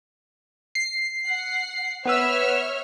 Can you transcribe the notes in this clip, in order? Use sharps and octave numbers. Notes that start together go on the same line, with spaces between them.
C7
F#5
B3 B4 C#5 E5 E6 F6